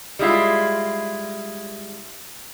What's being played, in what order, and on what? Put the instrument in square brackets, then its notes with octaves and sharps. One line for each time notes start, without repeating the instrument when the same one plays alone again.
[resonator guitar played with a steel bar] G3 G#3 E4 F4